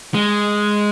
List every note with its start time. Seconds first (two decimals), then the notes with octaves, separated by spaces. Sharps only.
0.14 G#3